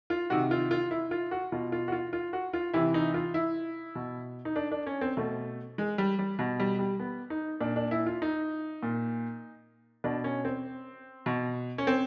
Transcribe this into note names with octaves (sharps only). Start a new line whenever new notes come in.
F4
C3 D#3 F#4
F4
F4
E4
F4
F#4
B2 F4
F4
F#4
F4
F4
F#4
F4
C3 E3 E4
D#4
F4
E4
B2
D#4
D4
D4
C#4
C4
B2 A3
G#3
G3
G3
B2
G3
G3
B3
D#4
A#2 D4
D4
E4
F4
D#4
A#2
B2 D4
C#4
C4
B2
C#4
C4